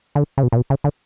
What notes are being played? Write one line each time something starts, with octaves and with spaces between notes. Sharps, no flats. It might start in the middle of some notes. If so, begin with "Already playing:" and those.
D3
C#3
B2
A#2
B2
C#3
D3